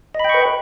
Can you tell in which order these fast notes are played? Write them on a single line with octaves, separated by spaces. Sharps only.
D#5 B5 G5 C#6 B4